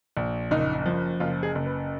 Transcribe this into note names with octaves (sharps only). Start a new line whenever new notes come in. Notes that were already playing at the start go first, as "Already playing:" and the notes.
A#1
F#1 D#4
F3
F#1 F4
G#4
F#1
B4